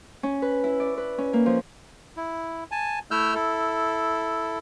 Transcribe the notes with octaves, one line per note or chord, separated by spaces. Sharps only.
C#4
B4
E4
D5
B4
C#4
A#3
F3
E4
G#5 A5
A3 E4 E6 F6 G6
E4 A4